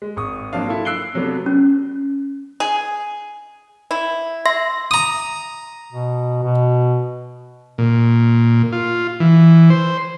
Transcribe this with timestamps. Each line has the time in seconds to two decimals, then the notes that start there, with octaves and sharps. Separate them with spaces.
0.02 G#3
0.16 G#1 C#6 D#6
0.53 F#3 A#3 C4 D4 F5
0.68 E4 F4 A4
0.85 E6 F#6 C7 D7 G7
1.14 C3 F#3 A3 B3 D4
1.46 C#4
2.60 G#4
3.91 E4
4.46 E5 C6 A#6
4.91 A#5 D#6
5.92 B2
6.43 B2
7.78 A#2
8.72 F4
9.20 E3
9.70 C5